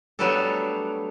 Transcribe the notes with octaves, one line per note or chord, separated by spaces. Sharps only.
F#3 G3 A3 B3 D4 A4